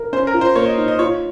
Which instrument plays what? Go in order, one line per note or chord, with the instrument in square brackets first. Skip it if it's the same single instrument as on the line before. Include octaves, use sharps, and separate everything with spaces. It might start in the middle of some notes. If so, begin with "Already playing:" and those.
Already playing: [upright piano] A#4
[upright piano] C#4 [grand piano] C5
[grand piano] A#4
[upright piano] F4
[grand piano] C5
[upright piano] A#3 [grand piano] C#5
[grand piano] D#5
[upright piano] D#4
[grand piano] D#5
[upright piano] F4 [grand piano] C#5